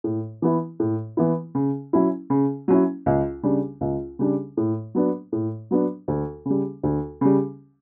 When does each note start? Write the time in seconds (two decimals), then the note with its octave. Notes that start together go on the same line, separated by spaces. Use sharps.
0.04 A2
0.42 E3 B3 E4
0.80 A2
1.17 E3 B3 E4
1.55 C#3
1.93 F#3 C#4 E4
2.30 C#3
2.68 F#3 C#4 E4
3.06 C#2
3.43 C#3 G3 D4
3.81 C#2
4.19 C#3 G3 D4
4.57 A2
4.95 F#3 B3 D4
5.32 A2
5.71 F#3 B3 D4
6.08 D2
6.45 C#3 G3
6.83 D2
7.21 C#3 G3